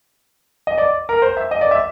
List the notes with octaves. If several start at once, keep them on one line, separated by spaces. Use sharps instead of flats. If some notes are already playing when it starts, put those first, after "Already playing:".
D#5
D5
A#4
C5
E5
D#5
D5
E5